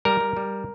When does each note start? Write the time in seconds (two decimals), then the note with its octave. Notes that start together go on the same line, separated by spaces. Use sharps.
0.05 G3 A#4
0.20 G3
0.37 G3